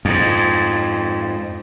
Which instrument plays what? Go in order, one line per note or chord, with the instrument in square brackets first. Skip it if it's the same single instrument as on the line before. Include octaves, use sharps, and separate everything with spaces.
[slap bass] F2 G#2